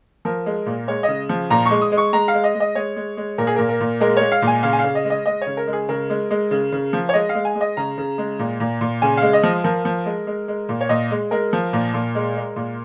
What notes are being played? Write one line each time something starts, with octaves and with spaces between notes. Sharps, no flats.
F3 A#4
G#3
A#2
G#3 C#5
C#3 D#5
F3
A#2 A#5
C#6
G#3
D#6
G#3
C#6
G#3 A#5
F5
G#3
D#5
G#3
D#5
G#3 C#5
G#3
G#3
A#2 A#4
G#4
A#2 A#4
A#4
A#2
G#3 A#4
G#3 C#5
F5
A#2
G#5
C#3 F5
G#5
F5
C#3
D#5
G#3
D#5
G#3 D#5
C#5
C#3
A#4
G#3
G#4
C#3 A#4
G#3
G#3
C#3
C#3
F3
C#5
G#3 D#5
F5
G#3
G#5
G#3
D#5
C#3 A#5
C#3
G#3
A#2
A#2
A#2
C#3 G#5
G#3 F5
D#5
F3
F3 A#4
F3
G#3
G#3
G#3
A#2
C#5
A#2 D#5
G#3
G#3 A#4
F3
A#2
A#2
G#3
G#3
A#2